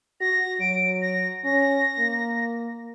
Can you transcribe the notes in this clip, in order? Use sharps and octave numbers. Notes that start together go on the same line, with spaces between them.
F#4 A#6
F#3 D7
A#6
C#4 A#6
A#3